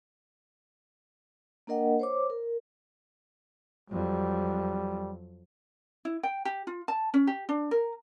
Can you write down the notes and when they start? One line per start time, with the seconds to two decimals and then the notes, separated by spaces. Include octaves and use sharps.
1.67 A#3 D4 A#4 D#5 F#5 G5
2.00 C5 C#5 D6
2.30 A#4
3.90 F2 F#3 G3
6.05 E4
6.23 G5
6.45 G4
6.67 F4
6.88 A5
7.14 C#4
7.27 G4
7.49 D4
7.71 A#4